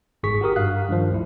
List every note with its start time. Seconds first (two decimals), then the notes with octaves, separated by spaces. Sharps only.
0.23 G1 G#2 G#4 C#6 B6
0.41 F#4 G4 A#4 D#6
0.56 G2 F5 F#6
0.89 G2 D#3 F3
1.11 D2 E4